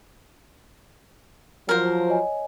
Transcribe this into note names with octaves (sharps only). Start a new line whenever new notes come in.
F3 F#3 A#4 C5
C#5 D#5 G#5